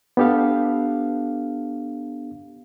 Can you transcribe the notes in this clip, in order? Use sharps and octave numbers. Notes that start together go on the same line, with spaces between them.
B3 D4 G4 A4 F5